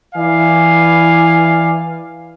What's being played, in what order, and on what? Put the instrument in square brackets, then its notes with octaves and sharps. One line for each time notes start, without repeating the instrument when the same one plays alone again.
[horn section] E3 E4 D5 F5 G#5